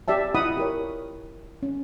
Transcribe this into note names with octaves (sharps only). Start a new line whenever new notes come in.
G4 D5 E5 A5
E4 F4 D#5 F#5 B5 D#6
G4 A#4 C#5
C#4